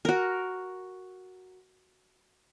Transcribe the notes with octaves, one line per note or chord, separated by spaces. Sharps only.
F#4 A#4